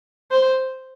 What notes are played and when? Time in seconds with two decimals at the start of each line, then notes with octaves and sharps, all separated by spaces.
0.31 C5